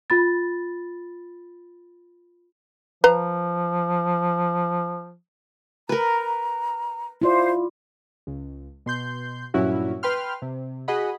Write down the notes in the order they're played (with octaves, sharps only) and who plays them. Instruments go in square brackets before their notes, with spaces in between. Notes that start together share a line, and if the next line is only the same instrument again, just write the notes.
[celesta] F4 B5 A6
[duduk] F3 [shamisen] B4 F5 A#5
[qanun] A#4 B4 [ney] A#5
[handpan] E4 F4 D5 [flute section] C5
[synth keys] C#2
B2 C6 G6
G2 A#2 F#3 C#4 E4 F#4
B4 G5 C6 F6
C3
F#4 G#4 D#5 F#5 B5